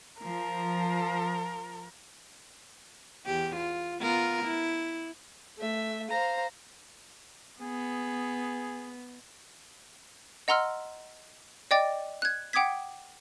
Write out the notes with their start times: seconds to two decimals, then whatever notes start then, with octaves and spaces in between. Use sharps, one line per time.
0.21 F3 A#4
3.26 E2 G4
3.56 F4
4.01 B3 F4 A#4
4.44 E4
5.58 A3 E5
6.09 C5 F5 A#5
7.61 B3 G#4
10.48 D#5 F#5 A#5 C6 E6 F6
11.71 D5 D#5 G5 D6 A6
12.22 F#6 G#6
12.53 F#5 G5 D6 D#6 G#6 B6